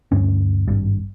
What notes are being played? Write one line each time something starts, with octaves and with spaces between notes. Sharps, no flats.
D2 G2 C#4
G#1 G2